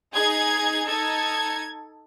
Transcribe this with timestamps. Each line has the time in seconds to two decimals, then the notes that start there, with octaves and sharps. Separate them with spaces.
0.14 D#4 G#4 G#6
0.88 D#4 A4 G#6